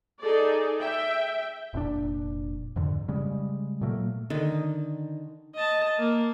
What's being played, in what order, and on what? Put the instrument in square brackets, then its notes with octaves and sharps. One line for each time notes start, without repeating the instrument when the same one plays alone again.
[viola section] D#4 G#4 A4 D5
E5 G5
[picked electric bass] F1 A#2 C#4 D4
F2 G#2 D3
C#3 G3 G#3
A#2 F#3 A3 A#3
[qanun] D3 D#3 D#4
[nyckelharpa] D#5 A5
A#3